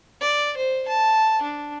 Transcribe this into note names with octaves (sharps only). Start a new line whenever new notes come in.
D5
C5
A5
D4